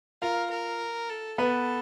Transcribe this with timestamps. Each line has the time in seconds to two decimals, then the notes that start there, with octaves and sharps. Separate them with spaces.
0.22 F4 A#4 F5
0.51 A#4
1.10 A4
1.38 B3 A4 B4